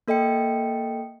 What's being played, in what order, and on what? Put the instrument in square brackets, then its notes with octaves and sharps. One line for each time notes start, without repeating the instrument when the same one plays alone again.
[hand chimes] A#3 A4 D#5 G5 C#7